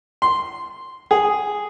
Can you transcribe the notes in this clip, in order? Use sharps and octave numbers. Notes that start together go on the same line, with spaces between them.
C6
G#4